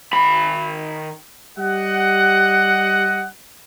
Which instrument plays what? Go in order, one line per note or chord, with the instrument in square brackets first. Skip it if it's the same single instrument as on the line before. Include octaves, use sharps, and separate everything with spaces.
[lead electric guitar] D#3 B5
[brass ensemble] G3 G4 D#5 F#5